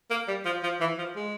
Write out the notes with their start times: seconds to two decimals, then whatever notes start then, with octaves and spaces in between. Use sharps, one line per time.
0.10 A#3
0.28 G3
0.46 F3
0.63 F3
0.81 E3
0.99 F3
1.16 G#3